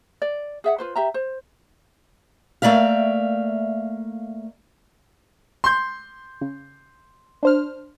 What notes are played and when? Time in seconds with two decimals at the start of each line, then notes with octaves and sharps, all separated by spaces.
0.22 D5
0.64 G#4 E5 F#5
0.78 F4 B4 C5
0.96 G4 E5 A#5
1.14 C5
2.62 A3 A#3 D5 E5 F5
5.64 C6 G6
6.41 C#3
7.43 D4 C5 F6